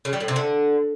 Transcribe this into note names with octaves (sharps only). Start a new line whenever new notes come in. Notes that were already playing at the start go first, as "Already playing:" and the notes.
C#3
G3
A2
C3
D3